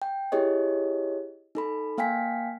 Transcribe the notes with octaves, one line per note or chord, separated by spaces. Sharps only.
G5
E4 G4 G#4 C#5 D#5
D#4 A4 B5
A#3 F5 G5 G#5 B6